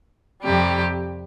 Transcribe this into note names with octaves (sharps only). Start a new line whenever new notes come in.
F2 C3 G3 G4